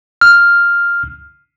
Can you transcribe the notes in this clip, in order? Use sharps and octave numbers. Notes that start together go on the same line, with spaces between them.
F6